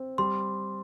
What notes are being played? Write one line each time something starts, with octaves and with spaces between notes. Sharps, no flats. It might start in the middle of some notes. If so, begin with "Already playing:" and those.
Already playing: C4
G3 C6